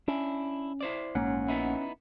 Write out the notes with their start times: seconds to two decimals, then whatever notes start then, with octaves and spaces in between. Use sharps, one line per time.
0.08 C#4 D4 E4
0.81 E4 C5 D5
1.15 A#1 G#2 A#3 C#4 F#5
1.48 B3 D#4 E4